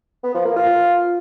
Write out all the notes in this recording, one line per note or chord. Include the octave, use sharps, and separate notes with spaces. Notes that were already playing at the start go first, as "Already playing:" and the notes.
B3
F3
A#3
F4